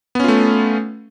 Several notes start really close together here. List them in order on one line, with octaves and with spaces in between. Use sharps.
B3 C#4 F4 A3